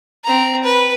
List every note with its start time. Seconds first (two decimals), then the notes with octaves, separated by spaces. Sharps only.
0.24 C4 A#5
0.64 B4